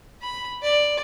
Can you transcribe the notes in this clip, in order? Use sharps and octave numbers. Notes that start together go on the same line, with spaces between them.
B5
D5